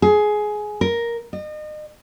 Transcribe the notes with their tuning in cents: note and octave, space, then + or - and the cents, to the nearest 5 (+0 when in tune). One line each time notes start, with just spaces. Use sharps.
G#4 +15
A#4 +5
D#5 -35